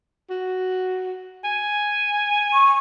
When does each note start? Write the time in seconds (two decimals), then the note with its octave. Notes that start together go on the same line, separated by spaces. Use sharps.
0.30 F#4
1.44 G#5
2.53 C#6